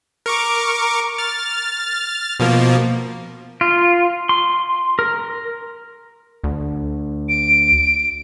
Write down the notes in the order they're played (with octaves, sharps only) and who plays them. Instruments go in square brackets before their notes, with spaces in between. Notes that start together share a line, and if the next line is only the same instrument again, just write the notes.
[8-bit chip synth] A#4 C#6 D6
F6 A6
B2 F3 A#3
[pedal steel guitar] F4
C6
A#4
[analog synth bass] D2
[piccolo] D7